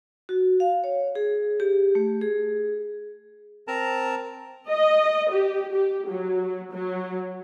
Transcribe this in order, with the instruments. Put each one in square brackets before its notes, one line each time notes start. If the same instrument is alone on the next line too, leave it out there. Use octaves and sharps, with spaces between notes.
[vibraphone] F#4
F5
C#5
G#4
G4
A3
G#4
[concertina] C4 A#4 A5 A#5
[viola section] D#5
G4
G4
F#3
F#3